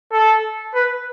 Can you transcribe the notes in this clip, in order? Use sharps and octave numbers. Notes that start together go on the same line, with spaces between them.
A4
B4